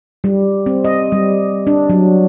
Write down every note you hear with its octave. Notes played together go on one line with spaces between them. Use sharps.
G3
C4
D#5
G3
D4
F#3